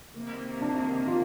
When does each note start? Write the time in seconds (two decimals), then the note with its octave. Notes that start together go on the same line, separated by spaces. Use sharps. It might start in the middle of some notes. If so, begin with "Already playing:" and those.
0.15 C3 D#3 A#3
0.61 D4
1.08 F4